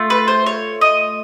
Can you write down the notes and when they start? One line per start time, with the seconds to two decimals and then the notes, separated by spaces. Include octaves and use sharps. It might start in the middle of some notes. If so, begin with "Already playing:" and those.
Already playing: A3 F4
0.10 B4
0.28 C5
0.46 C#5
0.81 D#5